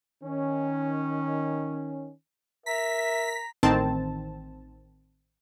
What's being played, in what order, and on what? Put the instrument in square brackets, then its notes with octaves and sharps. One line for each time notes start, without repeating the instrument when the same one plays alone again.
[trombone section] D#3 C#4
[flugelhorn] A#4 [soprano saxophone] E5 [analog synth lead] A#5 [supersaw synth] B6
[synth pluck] A1 D#3 C4 A5